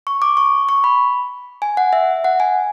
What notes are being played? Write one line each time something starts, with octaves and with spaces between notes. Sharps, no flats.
C#6
D6
C#6
C#6
B5
G#5
F#5
E5
F#5
G#5